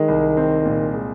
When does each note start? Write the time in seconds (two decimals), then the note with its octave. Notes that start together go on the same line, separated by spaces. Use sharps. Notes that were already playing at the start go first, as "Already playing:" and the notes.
Already playing: D#3 G#3
0.08 C2
0.37 C4
0.65 A#2
0.94 G#3